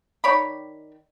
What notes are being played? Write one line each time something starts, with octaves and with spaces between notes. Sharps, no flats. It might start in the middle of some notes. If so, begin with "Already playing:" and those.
D#3 C#5 D5 B5